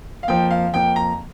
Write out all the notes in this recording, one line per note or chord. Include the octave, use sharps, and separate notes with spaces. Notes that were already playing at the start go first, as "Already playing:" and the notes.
F5
F2 F3 A#3 G5
F5
F2 F3 A#3 G5
A#5